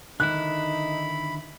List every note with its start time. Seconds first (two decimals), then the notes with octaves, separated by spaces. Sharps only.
0.20 D3 D#3 D#4 E4 B5 F#6